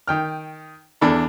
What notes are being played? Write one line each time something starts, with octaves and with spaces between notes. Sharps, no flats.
D#3 G5 F6
E2 D4 A4 B5